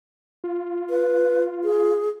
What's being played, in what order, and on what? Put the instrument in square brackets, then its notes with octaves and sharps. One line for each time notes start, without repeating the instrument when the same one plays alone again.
[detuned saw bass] F4
[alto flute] B4
G#4